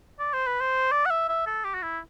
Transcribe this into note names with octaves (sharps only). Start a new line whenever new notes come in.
D5
C5
B4
C5
D5
F#5
E5
E5
A4
G4
F#4
E4